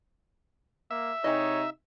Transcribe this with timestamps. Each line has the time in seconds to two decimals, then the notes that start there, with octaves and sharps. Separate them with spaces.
0.91 A#3 E5
1.24 C3 D#4 G4 G#4 C#5 D#5